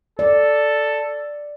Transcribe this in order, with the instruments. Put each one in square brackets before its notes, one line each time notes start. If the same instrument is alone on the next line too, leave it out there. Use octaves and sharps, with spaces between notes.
[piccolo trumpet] A4 [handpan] D5